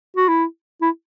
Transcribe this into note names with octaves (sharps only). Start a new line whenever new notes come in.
F#4
E4
E4